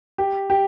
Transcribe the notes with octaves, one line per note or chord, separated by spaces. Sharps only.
G4
G4